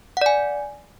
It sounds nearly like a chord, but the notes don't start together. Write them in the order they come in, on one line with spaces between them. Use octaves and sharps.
F#5 D5 G#5